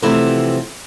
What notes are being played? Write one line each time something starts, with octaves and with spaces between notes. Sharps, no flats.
C3 E3 F3 A3 B3 E4